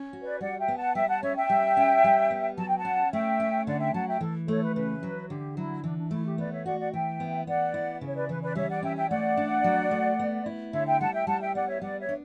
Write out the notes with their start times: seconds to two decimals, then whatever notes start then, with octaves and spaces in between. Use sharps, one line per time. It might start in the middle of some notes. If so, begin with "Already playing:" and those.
Already playing: C#4
0.13 F#4
0.22 B4 D5
0.41 G3 D5 F#5
0.59 E5 G5
0.68 B3
0.77 F#5 A5
0.95 G3 E5 G5
1.09 F#5 A5
1.22 C#4 C#5 E5
1.36 E5 G5
1.50 G3
1.77 C#4
2.04 G3
2.31 B3
2.58 F#3 A5
2.68 G5
2.78 F#5 A5
2.85 C#4
3.12 A3 E5 G5
3.40 C#4
3.67 D3 D5 F#5
3.80 E5 G5
3.94 F#3 F#5 A5
4.07 E5 G5
4.21 E3 A4
4.48 A3 A4 C#5
4.62 B4
4.75 C#3 B4
5.03 F#3
5.30 D3 G4
5.57 F#3 E4
5.84 E3 D4
5.98 D4
6.11 A3 E4
6.26 G4
6.38 B3 B4 D5
6.51 C#5 E5
6.66 F#4 D5 F#5
6.79 D5 F#5
6.92 E3 E5 G5
7.20 B3
7.47 B3 D5 F#5
7.74 E4
8.01 C#3
8.07 C#5
8.15 B4 D5
8.29 E3 B4
8.42 B4 D5
8.55 G3 C#5 E5
8.69 D5 F#5
8.83 C#4 E5 G5
8.96 E5 G5
9.10 A3 D5 F#5
9.37 D4
9.64 F#3
9.91 A3
10.19 B3
10.46 E4
10.73 D3 C#5 E5
10.87 E5 G5
11.00 G3 F#5 A5
11.13 E5 G5
11.27 G3 F#5 A5
11.41 E5 G5
11.55 B3 D5 F#5
11.68 C#5 E5
11.82 G3 D5 F#5
12.00 C#5 E5
12.09 D4